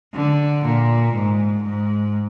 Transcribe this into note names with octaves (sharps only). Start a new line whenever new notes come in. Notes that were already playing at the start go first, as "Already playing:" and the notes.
D3
A#2
G#2
G#2